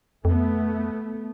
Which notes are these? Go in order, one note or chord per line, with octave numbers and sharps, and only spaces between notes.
F2 A3 B3